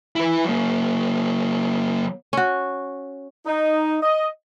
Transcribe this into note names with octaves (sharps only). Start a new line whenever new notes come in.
E4 B4
F#3 A#3
C#4 F#4
D#4
D#5